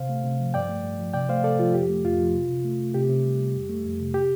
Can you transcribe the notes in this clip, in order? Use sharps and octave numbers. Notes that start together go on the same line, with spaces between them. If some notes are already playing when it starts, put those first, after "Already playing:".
Already playing: C3 C5 F5
A3
C3
F3
G2 D5 G5
A3
G2
F3
C3 D5 G5
A3 C5 F5
C3 A4 D5
F3 F4
F2 G4
A3
F2 F4
F3
C3
C3
A3
A3
C3 G4
C3
G3
G3
F2
A3
F2
C3
G4